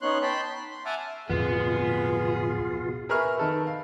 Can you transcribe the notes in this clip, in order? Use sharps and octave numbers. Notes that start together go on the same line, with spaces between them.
B3 C#4 D#4 C#5 C6 F#6
G5 A5 B5 C6
B5
C6
E5 F#5 G#5 A5 D6 F6
D1 F2 B2 B3 F4 G#4
G#4 A#4 B4 E5 C#6 F6
D#3 A4 B4
F5